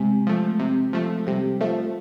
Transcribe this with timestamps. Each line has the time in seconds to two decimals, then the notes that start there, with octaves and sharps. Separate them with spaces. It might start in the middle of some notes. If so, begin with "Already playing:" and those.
Already playing: C3 G#3
0.27 F3 A3
0.59 C3
0.93 F3 A3
1.27 C3 G3
1.61 F3 A3